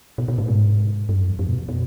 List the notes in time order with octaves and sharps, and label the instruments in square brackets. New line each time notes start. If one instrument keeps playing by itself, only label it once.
[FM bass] B2
B2
A2
G#2
G2
F#2
F2
F2
B2
B2